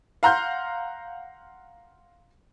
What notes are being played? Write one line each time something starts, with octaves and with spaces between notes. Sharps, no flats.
F5 F#5 A#5 C6 F6 G6